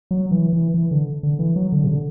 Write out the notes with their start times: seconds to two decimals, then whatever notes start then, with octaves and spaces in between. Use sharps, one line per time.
0.11 F#3
0.31 E3
0.53 E3
0.74 E3
0.91 D3
1.23 D3
1.39 E3
1.56 F#3
1.72 D3
1.84 C3
1.87 D3